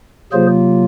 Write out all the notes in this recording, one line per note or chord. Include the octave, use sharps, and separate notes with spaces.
C3 F#3 A#3 F4 G#4 C5